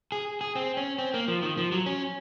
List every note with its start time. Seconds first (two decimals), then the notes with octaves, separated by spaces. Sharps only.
0.12 G#4
0.41 G#4
0.55 C4
0.77 C#4
0.99 C4
1.14 A#3
1.28 F3
1.43 D#3
1.57 F3
1.72 F#3
1.86 C#4